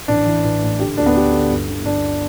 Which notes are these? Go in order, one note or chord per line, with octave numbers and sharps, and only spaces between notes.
A1 D4
E3
A1
A2
D3 G4
D2 D4
B3
D2 G4
D3
G1
D3
G1 D4